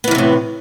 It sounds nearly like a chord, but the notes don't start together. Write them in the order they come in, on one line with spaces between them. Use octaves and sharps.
B3 E3 D#3 C3 A2